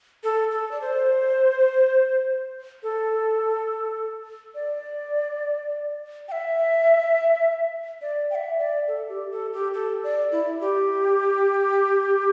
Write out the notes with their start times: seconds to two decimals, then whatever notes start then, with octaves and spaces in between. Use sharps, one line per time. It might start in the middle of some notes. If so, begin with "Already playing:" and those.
0.24 A4
0.51 A4
0.71 D5
0.81 C5
2.83 A4
4.55 D5
6.28 G5
6.32 E5
8.01 D5
8.30 G5
8.35 E5
8.59 D5
8.88 A4
9.09 G4
9.32 A4
9.53 G4
9.74 A4
10.04 D5
10.32 E4
10.61 G4